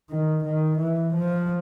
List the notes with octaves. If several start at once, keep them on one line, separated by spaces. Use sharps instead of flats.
D#3
D#3
E3
F3